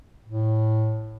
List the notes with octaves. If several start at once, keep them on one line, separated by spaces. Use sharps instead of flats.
A2